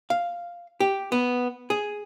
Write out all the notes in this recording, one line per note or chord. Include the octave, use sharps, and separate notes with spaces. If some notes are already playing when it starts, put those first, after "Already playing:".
F5
G4
B3
G#4